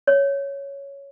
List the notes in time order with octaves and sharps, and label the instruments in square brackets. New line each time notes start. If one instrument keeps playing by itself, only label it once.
[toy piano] C#5